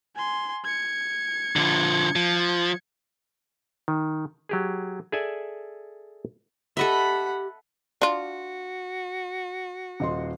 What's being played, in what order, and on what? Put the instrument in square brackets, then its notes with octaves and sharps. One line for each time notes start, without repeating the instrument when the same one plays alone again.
[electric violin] G#5 C6
G#6 C#7
[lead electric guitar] D3 F3
F3
[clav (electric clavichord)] D#3
F#3 G4 G#4
G#4 A4 D5 E5 G#5
[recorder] G4 [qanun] A4 D#5 E5 [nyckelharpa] F#5 B5
[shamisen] D4 F4 [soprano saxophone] F#4
[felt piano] D#1 D#5 C6